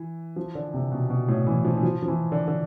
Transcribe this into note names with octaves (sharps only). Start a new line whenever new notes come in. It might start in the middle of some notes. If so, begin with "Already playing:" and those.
Already playing: E3
F3
D3
C3
B2
B2
A2
E3
F3
E3
F3
F3
E3
D3
D3